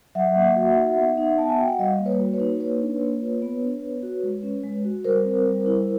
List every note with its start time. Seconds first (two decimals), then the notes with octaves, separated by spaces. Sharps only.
0.15 F#3 E5 F#5
0.36 A#3
0.56 F#4
0.77 D#4
0.97 B3
1.17 D#4
1.38 B3 A5
1.49 G#5
1.58 F#4 G5
1.69 F#5
1.79 G3 D#5 F5
1.99 A#3
2.06 B4 C#5
2.20 F#4
2.33 B4 C#5
2.40 D#4
2.60 A#3 B4 C#5
2.81 D4
3.01 A#3
3.21 F4
3.42 B3
3.63 D4
3.83 B3
4.03 F#4
4.23 G#3
4.43 C#4
4.64 G#3
4.85 F#4
5.04 G3 A#4 C5
5.25 C4
5.46 G3
5.66 E4